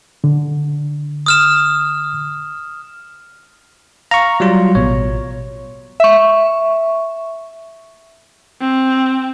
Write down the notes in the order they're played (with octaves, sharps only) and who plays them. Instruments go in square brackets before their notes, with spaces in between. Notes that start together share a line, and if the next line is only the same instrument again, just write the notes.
[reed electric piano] D3
[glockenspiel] D#6 F6 E7
[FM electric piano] F5 [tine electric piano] A#5 C#6
[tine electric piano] F#3 G3 F4
[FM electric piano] A1 B2 [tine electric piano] C#5
[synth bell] E5 C#6
[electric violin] C4